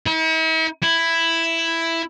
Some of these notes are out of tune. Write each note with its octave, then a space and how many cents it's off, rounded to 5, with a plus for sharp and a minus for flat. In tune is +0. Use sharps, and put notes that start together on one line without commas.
E4 -45
E4 +5